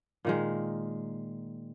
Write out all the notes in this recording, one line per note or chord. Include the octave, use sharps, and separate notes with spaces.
A#2 D#3 G#3